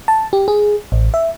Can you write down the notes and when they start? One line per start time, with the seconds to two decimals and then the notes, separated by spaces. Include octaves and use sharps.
0.08 A5
0.33 G4
0.48 G#4
0.92 A1
1.14 E5